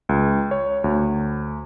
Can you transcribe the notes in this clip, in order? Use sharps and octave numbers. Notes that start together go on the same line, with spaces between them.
C#2
C#5
D2